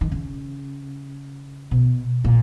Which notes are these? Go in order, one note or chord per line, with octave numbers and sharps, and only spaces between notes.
D#3
C#3
B2
A#2